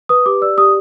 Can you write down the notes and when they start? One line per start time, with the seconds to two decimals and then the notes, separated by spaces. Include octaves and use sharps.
0.09 B4 D#6
0.26 G4 D6
0.42 D5 E6
0.57 G4 D#6